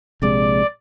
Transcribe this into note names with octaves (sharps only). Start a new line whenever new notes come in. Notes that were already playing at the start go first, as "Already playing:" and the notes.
A#1 C3 G#3 D5